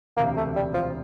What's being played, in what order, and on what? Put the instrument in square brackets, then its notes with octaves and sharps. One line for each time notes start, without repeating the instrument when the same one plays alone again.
[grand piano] E1 D2 C3 [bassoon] A#3
[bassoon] A3
G3
F3